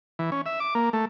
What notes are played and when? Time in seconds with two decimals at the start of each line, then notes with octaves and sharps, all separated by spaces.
0.19 E3
0.32 C#4
0.46 E5
0.60 D6
0.75 A#3
0.93 A3